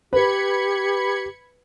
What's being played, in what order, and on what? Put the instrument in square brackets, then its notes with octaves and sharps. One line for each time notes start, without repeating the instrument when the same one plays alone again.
[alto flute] G4 [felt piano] B4 [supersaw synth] B5 G#6 C#7